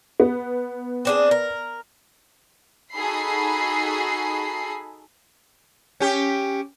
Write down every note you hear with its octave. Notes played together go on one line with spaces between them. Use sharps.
B3
C4 D4 G#4
A#4
D#4 F#4 G#4 A4 B5 C7
C#4 G4